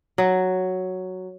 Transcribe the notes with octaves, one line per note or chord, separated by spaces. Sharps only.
F#3